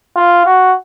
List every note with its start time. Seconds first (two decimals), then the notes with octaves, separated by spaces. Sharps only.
0.16 F4
0.46 F#4